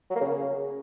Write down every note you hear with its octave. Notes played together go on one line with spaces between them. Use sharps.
F#3
A#3
C#3